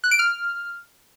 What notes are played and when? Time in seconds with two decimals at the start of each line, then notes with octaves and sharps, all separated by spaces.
0.04 F#6
0.11 D7
0.19 F6